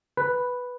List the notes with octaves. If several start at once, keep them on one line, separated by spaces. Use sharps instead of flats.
B4